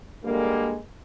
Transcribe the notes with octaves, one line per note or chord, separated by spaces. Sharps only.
D3 G3 G#3 A#3